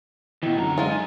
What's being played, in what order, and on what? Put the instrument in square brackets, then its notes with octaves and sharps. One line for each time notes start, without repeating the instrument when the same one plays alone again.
[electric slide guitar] B2 E3 [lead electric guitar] D#3
[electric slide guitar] F#2 D3 [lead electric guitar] F#3 A#5
[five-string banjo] G#3 F4
[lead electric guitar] D#4 G#5